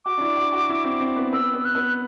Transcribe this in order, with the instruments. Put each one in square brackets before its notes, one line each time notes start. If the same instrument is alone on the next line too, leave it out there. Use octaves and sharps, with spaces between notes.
[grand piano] F#4 [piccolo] D6
[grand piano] D4
E4
F#4
F#4
E4
C4
C4
B3
[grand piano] B3 [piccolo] E6
[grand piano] B3
[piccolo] F#6
[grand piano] B3